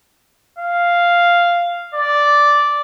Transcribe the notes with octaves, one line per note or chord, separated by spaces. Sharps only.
F5
D5